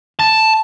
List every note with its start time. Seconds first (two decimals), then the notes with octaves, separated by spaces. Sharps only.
0.19 A5